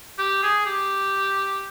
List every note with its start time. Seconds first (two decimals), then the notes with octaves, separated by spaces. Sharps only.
0.18 G4
0.43 G#4
0.66 G4